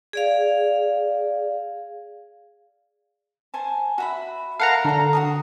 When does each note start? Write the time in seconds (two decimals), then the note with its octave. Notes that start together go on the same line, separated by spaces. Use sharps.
0.13 G#4 D5 F5
3.54 C5 G#5 A5
3.98 F#4 E5 B5
4.60 A4 A#4 F5 F#5 A#5
4.85 D3 A4 A#5
5.13 F#4 A#4 D#6